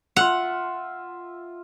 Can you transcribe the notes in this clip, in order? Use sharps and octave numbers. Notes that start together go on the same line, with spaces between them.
F4 E5 F#5